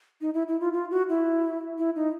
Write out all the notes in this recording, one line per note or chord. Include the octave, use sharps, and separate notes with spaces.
D#4
E4
E4
F4
F4
F#4
E4
E4
D#4